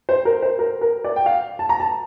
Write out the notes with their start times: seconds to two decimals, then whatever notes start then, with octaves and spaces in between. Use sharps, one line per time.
0.09 C5
0.25 A#4
0.42 C5
0.59 A#4
0.81 A#4
1.04 D5
1.16 G5
1.26 F5
1.59 A5
1.69 A#5
1.80 A5